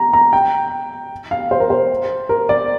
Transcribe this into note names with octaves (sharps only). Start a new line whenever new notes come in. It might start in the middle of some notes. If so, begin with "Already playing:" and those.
Already playing: A#5
A#5
G5
F5
C5
A#4
C5
A#4
D5